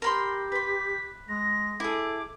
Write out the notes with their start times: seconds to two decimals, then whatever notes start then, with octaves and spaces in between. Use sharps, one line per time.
0.02 G4 A#4 B5 C6
0.52 B4 C6 B6
1.29 G#3 A#6
1.80 E4 G#4 A4 D6